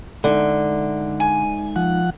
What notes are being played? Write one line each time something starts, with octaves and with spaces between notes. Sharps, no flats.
D3 G#3 D#4 E5
G#5
F3 F#5